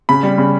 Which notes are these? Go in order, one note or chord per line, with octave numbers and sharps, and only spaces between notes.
C#3 B5
G3
C#3